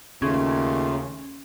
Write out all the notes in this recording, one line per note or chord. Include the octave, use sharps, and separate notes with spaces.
D#2 C#3 A3 C#4 F4